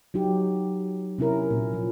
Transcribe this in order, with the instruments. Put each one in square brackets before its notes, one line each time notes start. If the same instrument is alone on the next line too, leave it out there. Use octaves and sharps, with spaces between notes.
[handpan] F#3 D#4 G4
C3 C#4 E4 A#4
A#2
F3